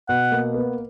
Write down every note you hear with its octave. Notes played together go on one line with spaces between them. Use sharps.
B2 F#5
A#3
B3